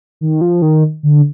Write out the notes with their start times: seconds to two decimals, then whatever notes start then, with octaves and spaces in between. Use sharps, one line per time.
0.21 D#3
0.41 F3
0.62 D#3
1.03 D3